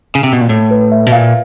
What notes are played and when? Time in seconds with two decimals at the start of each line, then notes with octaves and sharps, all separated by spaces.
0.15 C#3
0.23 C3
0.33 B2
0.41 A#2
0.49 A2
0.71 B4
0.92 E5
1.06 B2
1.12 A#2 F5